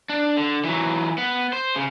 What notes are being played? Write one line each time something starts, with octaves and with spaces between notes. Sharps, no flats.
D4
D3
E3 F#3
B3
C5
C#3